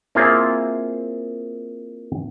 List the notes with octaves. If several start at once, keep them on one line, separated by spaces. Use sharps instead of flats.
A#3 C4 E4 F4 G#4